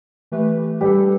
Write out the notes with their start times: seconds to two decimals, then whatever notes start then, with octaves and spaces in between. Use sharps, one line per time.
0.32 E3 A3 G4 B4
0.81 G3 D4 G4 A4 B4